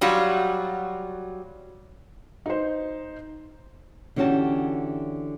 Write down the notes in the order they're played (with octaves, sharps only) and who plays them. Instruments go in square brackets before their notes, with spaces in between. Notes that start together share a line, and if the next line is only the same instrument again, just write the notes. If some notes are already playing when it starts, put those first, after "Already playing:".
[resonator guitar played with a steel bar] F#3 G3 F4 F#4
[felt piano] D#4 C5
[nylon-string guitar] D3 E3 C#4 F#4 G4 A5